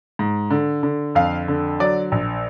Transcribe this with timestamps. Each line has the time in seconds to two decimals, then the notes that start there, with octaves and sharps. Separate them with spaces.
0.19 G#2
0.51 D3
0.83 D3
1.15 F2 F5
1.48 D3
1.80 F#3 D5
2.12 A#1